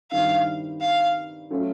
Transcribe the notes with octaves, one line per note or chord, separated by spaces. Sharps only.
G2 D#3 G3 C4 E4 F5
F5
F#3 A3 C#4 F4